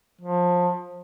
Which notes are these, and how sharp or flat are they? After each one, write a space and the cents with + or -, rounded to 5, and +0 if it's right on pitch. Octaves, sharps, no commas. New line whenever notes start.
F3 +25